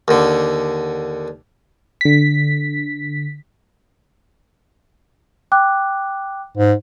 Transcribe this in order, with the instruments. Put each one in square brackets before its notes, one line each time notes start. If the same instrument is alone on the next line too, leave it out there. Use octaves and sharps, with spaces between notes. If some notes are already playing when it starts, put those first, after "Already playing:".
[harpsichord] D#2 D3
[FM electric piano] D3 B6
[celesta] G5 D6 F#6
[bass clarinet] G#2